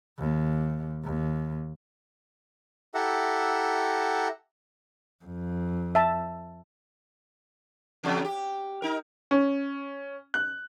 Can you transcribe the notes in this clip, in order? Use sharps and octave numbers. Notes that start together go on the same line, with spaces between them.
D#2
D#2
E4 G4 A4 E5 F#5 A#5
F2
E5 A5
E2 C#3 F#3
G4
D#4 A#4
C#4
F#6